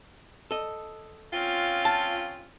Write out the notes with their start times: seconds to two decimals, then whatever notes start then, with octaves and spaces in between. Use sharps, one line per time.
0.51 A4 D#5
1.32 C4 C#4 F4
1.85 A5